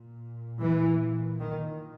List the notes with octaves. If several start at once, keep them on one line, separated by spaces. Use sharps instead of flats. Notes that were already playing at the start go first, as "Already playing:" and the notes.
Already playing: A#2
E3
D#3